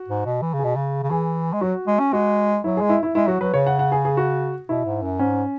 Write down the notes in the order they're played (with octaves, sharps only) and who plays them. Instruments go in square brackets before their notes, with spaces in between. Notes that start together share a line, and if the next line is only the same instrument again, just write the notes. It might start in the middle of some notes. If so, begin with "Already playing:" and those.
Already playing: [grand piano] F#4
[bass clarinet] G#2
B2
E3
C#3
[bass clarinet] B2 [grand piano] G#4
[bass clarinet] C#3
C#3
[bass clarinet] E3 [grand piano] G#4
[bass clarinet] G#3
[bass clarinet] F#3 [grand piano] F#4
[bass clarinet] G#3
C#4
[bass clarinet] G#3 [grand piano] F#4
[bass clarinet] F#3 [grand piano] E4
[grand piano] G#4
[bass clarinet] G#3
[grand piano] E4
E4
[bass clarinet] G#3 [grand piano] E4
[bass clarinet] F#3 [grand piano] F#4
[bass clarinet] F#3 [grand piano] B4
[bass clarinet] C#3 [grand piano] C#5
[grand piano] F#5
F#5
G#4
G#4
F#4
[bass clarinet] B2 [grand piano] E4
[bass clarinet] G#2
F#2
[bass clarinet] G#2 [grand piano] C#4